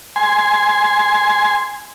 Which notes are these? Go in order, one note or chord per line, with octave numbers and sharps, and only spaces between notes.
G#5 C6